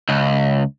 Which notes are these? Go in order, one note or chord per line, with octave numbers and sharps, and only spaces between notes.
C#2